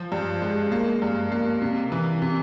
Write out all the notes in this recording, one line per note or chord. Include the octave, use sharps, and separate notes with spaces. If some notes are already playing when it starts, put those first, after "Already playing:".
Already playing: F3
G2
G#3
A#3
G2
A#3
C3
E3
C3